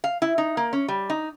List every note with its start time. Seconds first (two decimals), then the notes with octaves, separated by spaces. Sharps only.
0.04 F5
0.22 E4
0.38 D#4
0.57 A#3
0.73 C#4
0.88 G3
1.10 D#4